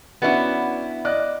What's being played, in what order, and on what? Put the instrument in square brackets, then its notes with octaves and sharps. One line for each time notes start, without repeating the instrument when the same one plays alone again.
[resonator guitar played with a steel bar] B3 E4 [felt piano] C#4 D4 F#4
[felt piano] D5 D#5 F#6